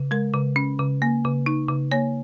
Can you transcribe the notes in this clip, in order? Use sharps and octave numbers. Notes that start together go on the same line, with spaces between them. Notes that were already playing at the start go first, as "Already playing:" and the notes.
Already playing: C#3
G#3 A#4
C#3
C#4
C#3
A#3
C#3
D#4
C#3
A#3 C#5